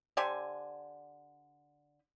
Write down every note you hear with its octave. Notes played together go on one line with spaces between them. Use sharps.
D3 G4 C5 G#5